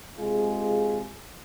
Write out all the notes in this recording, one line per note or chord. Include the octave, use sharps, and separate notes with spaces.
C3 G#3 F4 G#4